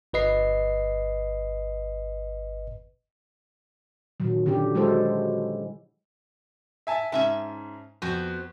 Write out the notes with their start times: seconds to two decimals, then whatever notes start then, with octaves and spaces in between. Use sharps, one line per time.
0.13 G1 B4 D#5 C7
4.20 A#2 D#3 F#3
4.46 D3 C#4 G4
4.75 F#3 G#3 E4 A4 C5
6.87 E5 G#5 A5
7.12 G#2 C#4 E5 A5
8.02 F2 B3 F#4 C5